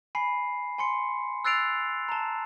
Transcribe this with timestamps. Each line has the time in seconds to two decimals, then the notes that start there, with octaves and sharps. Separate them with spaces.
0.15 G#5 B5 C7
0.78 G#5 C6 C#7
1.45 E6 F#6 A6 C7 D7 F7
2.09 A5 A#5